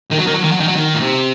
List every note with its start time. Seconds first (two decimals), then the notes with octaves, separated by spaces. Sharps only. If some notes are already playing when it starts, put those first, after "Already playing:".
0.11 D#3
0.19 F#3
0.27 D#3
0.35 F#3
0.44 D#3
0.51 F#3
0.60 D#3
0.68 F#3
0.76 D#3
0.94 A#2
1.00 C3